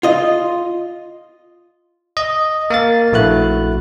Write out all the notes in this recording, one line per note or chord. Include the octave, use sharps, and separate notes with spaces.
F4 D#5
D#5
A#3 F5 A6
A#1 A3 E4 F#4 F#6